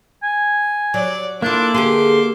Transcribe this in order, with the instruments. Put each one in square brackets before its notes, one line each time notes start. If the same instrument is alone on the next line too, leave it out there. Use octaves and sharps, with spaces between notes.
[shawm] G#5
[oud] F#3 [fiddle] D5
[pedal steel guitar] A#3 A4 [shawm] D4 [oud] E4 F4 [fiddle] D6
[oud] D3 G4 G#4 [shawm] C6